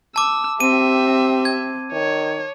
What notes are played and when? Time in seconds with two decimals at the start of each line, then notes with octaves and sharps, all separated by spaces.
0.16 A5 D6 E6
0.60 C4 G4 E5 D#7
1.45 G#6
1.92 D#3 C#5